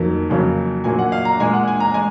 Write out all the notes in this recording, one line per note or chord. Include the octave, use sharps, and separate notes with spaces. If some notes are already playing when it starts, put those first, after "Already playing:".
Already playing: F2 D#3 F#3 A#3
F2 C#3 F#3 A#3
A#2 F#3 A#3 G#5
F#5
F5
A#5
A#2 G#3 G#5
F#5
G#5
A#5
G#3 G#5